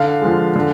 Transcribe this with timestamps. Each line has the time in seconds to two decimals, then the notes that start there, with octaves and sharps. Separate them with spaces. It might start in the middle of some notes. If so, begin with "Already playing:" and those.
Already playing: D3 F5
0.21 F3 G#3
0.55 D3